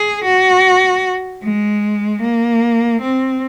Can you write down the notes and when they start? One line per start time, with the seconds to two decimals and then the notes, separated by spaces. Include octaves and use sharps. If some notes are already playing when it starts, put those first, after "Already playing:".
Already playing: G#4
0.24 F#4
1.44 G#3
2.22 A#3
3.01 C4